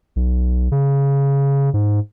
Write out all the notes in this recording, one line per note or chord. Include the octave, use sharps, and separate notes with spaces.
B1
C#3
G#2